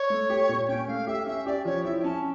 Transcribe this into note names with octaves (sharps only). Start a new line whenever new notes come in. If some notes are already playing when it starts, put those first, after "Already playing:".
Already playing: C#5
A3
G4
A#2
C#4 G5
A3 F5
G4 E5
C#4 E5
G4 D5
F3 C#5
E4 E5
G5
C#4 A5